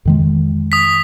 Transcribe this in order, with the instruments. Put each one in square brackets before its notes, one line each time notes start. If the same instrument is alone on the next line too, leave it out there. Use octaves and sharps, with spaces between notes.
[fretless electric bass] F2 D#3 G#3
[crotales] D#6 B6